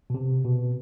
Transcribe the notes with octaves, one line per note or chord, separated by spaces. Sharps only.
B2
C3
B2